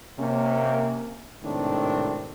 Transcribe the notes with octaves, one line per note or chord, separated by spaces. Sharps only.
C3 A#3 C#4
G#1 A2 C3 D#3 C4 D4